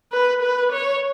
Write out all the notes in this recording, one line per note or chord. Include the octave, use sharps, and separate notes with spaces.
B4
B4
C#5